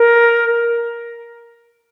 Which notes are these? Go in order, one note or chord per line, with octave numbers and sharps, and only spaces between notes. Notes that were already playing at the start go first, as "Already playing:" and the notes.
Already playing: A#4